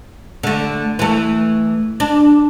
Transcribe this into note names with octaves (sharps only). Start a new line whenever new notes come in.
D3 A3
E3 A3
D4